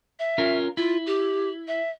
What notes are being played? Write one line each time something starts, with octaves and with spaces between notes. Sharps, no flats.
E5
C#4 F4 A#4
E4 F4
G4
E5